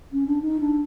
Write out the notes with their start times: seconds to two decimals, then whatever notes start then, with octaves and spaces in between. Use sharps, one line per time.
0.13 C#4
0.27 D4
0.42 D#4
0.60 D4